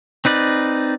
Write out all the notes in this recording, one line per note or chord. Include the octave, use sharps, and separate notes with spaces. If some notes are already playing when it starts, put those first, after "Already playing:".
C4 D#4 B4 D5